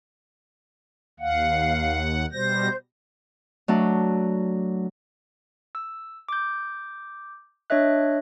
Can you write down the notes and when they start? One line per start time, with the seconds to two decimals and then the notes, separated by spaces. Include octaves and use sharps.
1.19 D#2 F5 F#5
2.33 B2 G3 C5 G6 A#6
3.68 F#3 A3 D4
5.75 E6
6.29 D6 G6
7.70 D4 C#5 D#5 E5 F#6